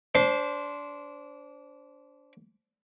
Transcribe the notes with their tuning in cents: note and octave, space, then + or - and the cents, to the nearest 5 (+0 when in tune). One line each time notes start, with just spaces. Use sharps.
D4 -25 C5 +0